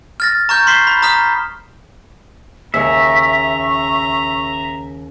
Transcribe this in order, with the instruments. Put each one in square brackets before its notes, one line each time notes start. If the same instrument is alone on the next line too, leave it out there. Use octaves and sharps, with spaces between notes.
[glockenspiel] F6 A6 A#6
A#5 C#6 F6 G6
C6 C#6 B6 C7 E7 G7
B5
A#5 D#6 F6 B6
[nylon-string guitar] D#2 C#3 [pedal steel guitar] E5 [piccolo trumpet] A#5 [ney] C#6